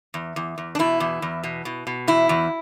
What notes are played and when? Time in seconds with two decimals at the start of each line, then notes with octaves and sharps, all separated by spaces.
0.14 E2
0.36 E2
0.58 E2
0.75 D4
0.79 B2 E4
1.00 E2
1.22 E2
1.43 B2
1.65 B2
1.87 B2
2.07 E2 E4
2.29 E2